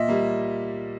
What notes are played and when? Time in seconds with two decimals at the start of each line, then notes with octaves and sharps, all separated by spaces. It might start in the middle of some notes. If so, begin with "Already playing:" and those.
Already playing: A#2 D#5 E5
0.08 G3 A#3